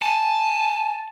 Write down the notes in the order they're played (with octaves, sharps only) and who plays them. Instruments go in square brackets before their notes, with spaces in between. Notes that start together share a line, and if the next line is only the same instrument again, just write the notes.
[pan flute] G#5 [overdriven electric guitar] A5